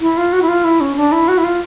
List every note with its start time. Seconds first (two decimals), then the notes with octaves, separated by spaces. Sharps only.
0.01 E4
0.17 F4
0.33 F#4
0.42 E4
0.49 F4
0.64 E4
0.81 C#4
0.96 D4
1.12 E4
1.28 F#4
1.38 E4
1.44 F4